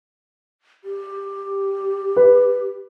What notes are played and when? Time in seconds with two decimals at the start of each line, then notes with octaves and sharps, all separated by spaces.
0.84 G4
2.16 B4